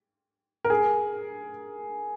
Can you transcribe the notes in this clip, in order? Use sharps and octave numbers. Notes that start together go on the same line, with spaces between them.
A#4
G#4